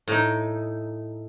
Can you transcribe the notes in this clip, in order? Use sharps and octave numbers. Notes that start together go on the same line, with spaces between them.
A2 D#4